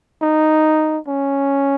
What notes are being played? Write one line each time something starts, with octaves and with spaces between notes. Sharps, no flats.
D#4
C#4